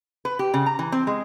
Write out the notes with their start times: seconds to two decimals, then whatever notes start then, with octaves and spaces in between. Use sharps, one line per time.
0.25 B4
0.39 G4
0.54 C#3
0.66 A#5
0.79 E3
0.92 C4
1.07 G#3